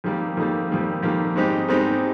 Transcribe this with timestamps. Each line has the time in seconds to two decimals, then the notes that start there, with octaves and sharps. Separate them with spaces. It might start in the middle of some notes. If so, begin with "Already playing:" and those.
0.04 F2 D#3 G3 A#3
0.37 F2 D#3 G3 A#3
0.70 F2 D#3 G3 A#3
1.03 F2 D#3 G3 A#3
1.36 G#2 G3 C4 D#4 G4
1.68 G#2 G3 C4 D#4 G4